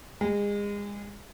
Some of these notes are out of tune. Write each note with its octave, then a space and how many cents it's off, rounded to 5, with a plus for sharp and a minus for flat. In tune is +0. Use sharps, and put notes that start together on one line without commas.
G#3 -30